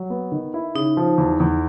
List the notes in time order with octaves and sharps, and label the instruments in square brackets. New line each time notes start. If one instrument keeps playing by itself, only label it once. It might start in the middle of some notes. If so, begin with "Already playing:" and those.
Already playing: [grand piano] F#3
B3
D#3
E4
[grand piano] C#3 [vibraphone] D#4
[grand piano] F3
E2
E2